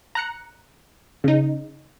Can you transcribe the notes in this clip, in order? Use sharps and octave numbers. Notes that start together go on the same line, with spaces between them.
A#5 F#6 C#7
C#3 D#4